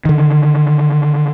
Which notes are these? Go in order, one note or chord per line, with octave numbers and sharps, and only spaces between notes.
D3 D#3